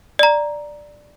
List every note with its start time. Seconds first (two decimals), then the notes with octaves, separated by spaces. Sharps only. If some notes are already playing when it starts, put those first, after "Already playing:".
0.19 D5 A#5